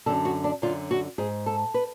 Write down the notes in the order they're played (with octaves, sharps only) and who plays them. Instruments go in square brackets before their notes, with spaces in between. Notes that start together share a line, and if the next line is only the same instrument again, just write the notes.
[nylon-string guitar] F#2 D3 A4
F#4
D4
F#2 D3 F4
F#4
G#2 G#4
A4
B4